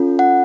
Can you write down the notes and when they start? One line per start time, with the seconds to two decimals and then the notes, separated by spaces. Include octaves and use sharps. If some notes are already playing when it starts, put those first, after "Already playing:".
Already playing: C#4 F4 A4
0.19 F#5